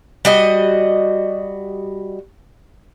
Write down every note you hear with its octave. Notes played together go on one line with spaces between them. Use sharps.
G3 F#4 D#5